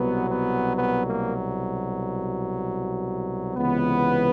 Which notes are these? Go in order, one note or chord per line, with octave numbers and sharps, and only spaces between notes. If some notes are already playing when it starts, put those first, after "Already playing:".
Already playing: C2 B2 F#3 B3
B3
B3
A#3
C#2 C3 E3 B3